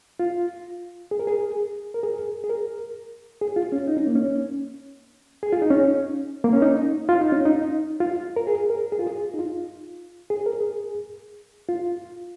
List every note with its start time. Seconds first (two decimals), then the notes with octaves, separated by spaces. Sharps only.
0.20 F4
1.11 G#4
1.20 A#4
1.27 G#4
1.94 A#4
2.03 G#4
2.44 G#4
2.50 A#4
3.41 G#4
3.56 F4
3.72 C#4
3.87 D#4
3.97 C#4
4.07 A#3
4.16 C#4
5.43 G#4
5.53 F4
5.62 D#4
5.70 C#4
6.44 A#3
6.53 C#4
6.62 D#4
7.09 F4
7.21 D#4
7.32 C#4
7.45 D#4
8.00 F4
8.36 A#4
8.47 G#4
8.70 A#4
8.92 G#4
8.99 F4
9.07 G#4
9.34 D#4
9.39 F4
10.30 G#4
10.46 A#4
10.61 G#4
11.69 F4